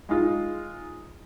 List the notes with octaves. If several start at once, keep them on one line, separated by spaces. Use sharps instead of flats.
G#3 D#4 F4